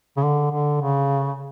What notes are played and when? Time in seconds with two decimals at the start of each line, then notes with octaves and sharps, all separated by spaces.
0.17 C#3
0.23 D3
0.52 D3
0.82 C#3